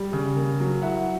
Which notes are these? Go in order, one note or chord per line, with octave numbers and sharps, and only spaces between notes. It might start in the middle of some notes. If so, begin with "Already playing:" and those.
Already playing: G3
C#3
A#3
F#3
E4 E5 F#5